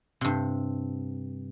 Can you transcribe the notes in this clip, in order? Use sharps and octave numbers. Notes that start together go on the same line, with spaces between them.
G2 C3